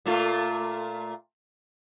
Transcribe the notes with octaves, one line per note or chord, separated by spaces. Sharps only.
A#2 A3 F4